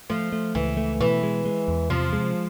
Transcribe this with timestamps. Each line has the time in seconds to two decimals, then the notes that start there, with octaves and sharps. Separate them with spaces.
0.10 F3 A3
0.33 A3
0.55 C#2 E3
0.77 A3
1.00 B2 E3
1.23 G#3
1.45 G#3
1.68 E2
1.90 C3 F3
2.13 G#3